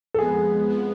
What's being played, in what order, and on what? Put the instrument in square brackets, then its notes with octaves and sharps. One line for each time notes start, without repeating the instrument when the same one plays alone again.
[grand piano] A4
[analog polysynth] F2 F3 G#3 B3 [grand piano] G#4
[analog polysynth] F2 F3 G#3 B3